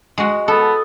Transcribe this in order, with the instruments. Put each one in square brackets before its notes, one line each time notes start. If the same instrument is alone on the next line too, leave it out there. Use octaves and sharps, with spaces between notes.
[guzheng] G#3 F#4
[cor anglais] B3 [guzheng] A4